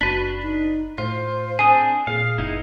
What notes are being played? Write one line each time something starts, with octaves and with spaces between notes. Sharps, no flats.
F#1 D4 F#4 B4 B6
D#4
A2 F4 C5
C4 D4 G#4 G#5 D#6
A#2 G#4 F5
F#1 B3 D#4 E4